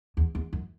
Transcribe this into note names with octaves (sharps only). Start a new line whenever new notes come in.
E2
E2
F#2